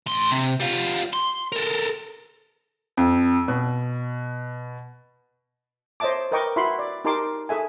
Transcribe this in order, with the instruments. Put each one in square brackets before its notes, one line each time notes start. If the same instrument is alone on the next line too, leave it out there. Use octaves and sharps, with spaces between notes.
[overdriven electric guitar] A2 C6
C3
G3 F4
C6
A4 A#4
[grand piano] F2
B2
[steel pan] C5 C#5 D#5 E5 A5 D6
A#4 B4 D#5 G5 C#6 D6
E4 F#4 B4 E5 B5 C6
D5
D#4 G4 A#4 A5 C6 D6
G#4 A4 E5 G#5